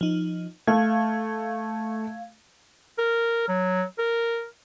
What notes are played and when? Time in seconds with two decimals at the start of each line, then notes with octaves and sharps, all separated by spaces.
0.01 F3 D#4
0.67 A3 F5 G#6
2.98 A#4
3.48 F#3
3.98 A#4